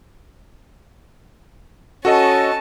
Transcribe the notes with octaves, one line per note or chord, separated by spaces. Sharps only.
C#4 F#4 A4 D#5 A5